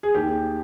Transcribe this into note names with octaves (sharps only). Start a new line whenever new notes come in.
G#4
D#2 G4